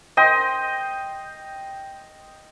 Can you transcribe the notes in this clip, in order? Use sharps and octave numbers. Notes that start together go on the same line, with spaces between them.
D#5 G5 C6